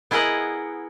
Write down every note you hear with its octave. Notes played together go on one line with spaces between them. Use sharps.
B3 E4 G#4 A#4 D#5 F#5